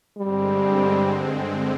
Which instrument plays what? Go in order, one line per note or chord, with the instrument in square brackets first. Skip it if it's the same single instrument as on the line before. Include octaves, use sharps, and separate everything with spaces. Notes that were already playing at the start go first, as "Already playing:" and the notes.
[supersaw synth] G2 D3 G#3 C4 [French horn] G3